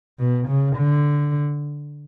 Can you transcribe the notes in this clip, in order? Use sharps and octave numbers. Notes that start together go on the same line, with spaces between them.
B2
C#3
D3